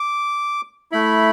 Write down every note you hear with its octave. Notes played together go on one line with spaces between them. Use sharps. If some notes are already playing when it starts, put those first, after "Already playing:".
Already playing: D6
A3 E4 B5